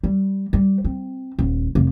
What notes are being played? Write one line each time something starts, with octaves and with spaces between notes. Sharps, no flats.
G3
G3
C4
D#1
F1